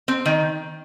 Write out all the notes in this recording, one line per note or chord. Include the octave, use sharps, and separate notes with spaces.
C4
D#3